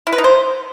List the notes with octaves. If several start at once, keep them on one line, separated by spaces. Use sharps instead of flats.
E4
B4
D#4
C5